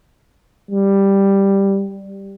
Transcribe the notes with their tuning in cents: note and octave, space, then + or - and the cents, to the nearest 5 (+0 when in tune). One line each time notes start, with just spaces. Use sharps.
G3 +5